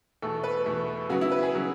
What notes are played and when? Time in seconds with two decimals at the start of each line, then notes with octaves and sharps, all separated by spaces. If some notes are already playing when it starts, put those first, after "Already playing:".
0.22 E2 B2 A3 A4
0.44 B4
0.66 E2 B2 A3
1.09 C#3 F#3 B3 F#4
1.21 E4
1.31 B4
1.43 G#4
1.54 C#3 F#3 B3